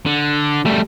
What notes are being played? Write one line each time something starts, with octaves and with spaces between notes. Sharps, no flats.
D3
G3 A3